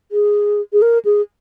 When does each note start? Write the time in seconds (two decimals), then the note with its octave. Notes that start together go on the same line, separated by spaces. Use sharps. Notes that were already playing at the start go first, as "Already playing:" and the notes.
0.12 G#4
0.73 G#4
0.82 A#4
1.05 G#4